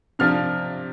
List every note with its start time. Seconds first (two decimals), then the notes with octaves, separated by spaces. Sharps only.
0.19 C3 F3 D4 F6